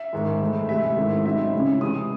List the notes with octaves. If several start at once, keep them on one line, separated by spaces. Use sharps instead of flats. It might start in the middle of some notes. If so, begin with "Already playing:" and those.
Already playing: E5
G#2 D#3 G#3
A2 E3 A3
C3 E3 G#3 E5
G#2 D#3 A3 C4 E4
A2 F#3 C4 D#4 E5
C#3 G#3 C#4 E4
C3 E3 G#3 D#6